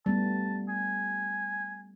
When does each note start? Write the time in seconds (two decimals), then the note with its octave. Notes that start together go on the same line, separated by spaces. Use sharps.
0.06 G3 A3 B3 A5
0.69 G#5